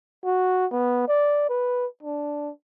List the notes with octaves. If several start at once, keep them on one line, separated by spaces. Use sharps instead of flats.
F#4
B3
D5
B4
D4